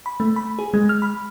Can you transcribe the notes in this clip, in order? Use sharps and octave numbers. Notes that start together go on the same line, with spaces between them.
B5
A3
B5
G#4
G#3
F6
B5